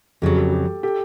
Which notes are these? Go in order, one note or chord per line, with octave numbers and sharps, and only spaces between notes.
F2 C#3 F#3 G4 A4
G4 A4
G4 A4
G4 A4